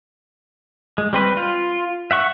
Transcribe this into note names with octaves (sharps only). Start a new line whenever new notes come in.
G#3
G3 C4 B4
F4
E5 F#5 C#6